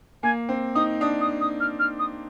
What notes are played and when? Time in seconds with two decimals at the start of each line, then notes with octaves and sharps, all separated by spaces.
0.23 A#3 G#5
0.49 C4
0.75 D#4 D#6
1.01 D4 D#6
1.21 D#6
1.41 D#6
1.60 F6
1.79 F6
1.99 D#6